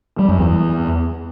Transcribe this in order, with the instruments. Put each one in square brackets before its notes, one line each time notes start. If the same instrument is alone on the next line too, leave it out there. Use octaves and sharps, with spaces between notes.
[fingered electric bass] G3
F#2
E2